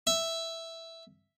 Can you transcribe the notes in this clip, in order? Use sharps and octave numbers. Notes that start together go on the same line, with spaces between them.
E5